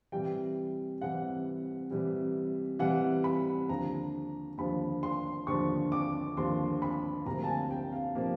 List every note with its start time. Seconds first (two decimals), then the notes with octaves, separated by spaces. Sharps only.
0.12 C3 E3 G3 G5
1.01 C3 E3 G3 F#5
1.90 C3 E3 G3
2.79 C3 E3 G3 F#5
3.24 B5
3.69 D#2 D3 F3 A#5
4.58 D#2 D3 F3 B5
5.03 C6
5.47 D#2 D3 F3 C#6
5.92 D6
6.37 D#2 D3 F3 C6
6.82 B5
7.26 D2 C3 F3 A#3 A#5
7.44 A5
7.48 G#5
7.71 G5
7.92 F5
8.15 C3 F3 A#3